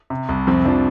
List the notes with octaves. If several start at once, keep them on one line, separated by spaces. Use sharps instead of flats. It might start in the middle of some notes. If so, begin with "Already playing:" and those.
C3
C2
F2 C4
F3 D4